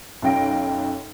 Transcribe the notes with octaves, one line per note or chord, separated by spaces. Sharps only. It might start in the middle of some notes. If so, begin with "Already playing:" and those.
B1 F#2 F5 G5 A#6 D7